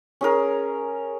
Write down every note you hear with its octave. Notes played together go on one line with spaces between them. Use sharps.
C#4 G#4 A#4